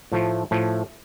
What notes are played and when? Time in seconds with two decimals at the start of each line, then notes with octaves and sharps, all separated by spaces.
0.12 A2 F3 A3
0.51 A2 F3 A3